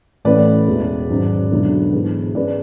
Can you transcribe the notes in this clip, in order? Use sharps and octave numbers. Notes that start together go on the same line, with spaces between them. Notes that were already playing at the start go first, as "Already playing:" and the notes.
A1 A2 E3 A3 C#4 B4 D5
E1 E2 B2 G#3
G#1 G#2 F#3 C#4
E1 E2 D3 F#3
G#2 E3 G#3 B3
G#2 G#3 C#4 B4 D5